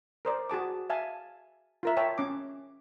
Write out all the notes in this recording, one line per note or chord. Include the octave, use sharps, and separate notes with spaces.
A#4 C5 D5
F#4 G#4 A5 D6
E5 F5 G#5 A5
F4 A#4 E5
C#5 E5 G5 A5
C#4 D6